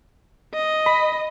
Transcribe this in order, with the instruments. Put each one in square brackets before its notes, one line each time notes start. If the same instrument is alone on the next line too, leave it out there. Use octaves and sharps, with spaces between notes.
[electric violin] D#5
[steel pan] B5